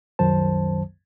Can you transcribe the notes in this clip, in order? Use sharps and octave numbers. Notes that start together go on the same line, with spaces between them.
C2 F#2 D#3 F#3 C5 A5